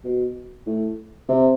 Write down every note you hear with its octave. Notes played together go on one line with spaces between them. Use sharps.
B2
A2
C3